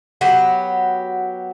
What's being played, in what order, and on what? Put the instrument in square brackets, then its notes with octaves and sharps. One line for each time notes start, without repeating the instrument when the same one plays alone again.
[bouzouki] F#3 B3 G4 F#5